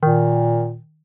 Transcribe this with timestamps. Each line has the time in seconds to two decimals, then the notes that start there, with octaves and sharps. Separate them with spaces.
0.03 A#2 D#3